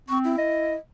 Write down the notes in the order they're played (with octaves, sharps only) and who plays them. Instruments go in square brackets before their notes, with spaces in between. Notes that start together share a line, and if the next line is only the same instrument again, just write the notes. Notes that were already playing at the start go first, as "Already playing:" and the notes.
[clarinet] C4 [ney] C#6
[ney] E4
[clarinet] D#5